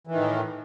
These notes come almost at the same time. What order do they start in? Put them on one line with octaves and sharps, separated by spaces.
E3 D#3 A2